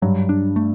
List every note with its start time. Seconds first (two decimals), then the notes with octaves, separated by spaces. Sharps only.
0.02 G2 F#3
0.29 D4
0.56 A3